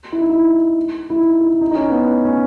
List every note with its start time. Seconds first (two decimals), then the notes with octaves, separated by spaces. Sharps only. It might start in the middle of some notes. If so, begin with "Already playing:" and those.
0.12 E4
0.21 D#4
0.29 E4
1.10 E4
1.19 D#4
1.41 E4
1.61 D#4
1.71 D#4
1.75 C#4
1.90 B3
2.25 C#4